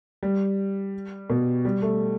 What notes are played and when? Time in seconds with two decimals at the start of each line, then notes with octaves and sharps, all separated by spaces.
0.23 G3
1.30 B2
1.65 G3
1.82 A3